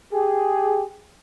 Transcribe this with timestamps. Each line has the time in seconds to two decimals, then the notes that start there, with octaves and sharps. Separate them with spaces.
0.13 G4 G#4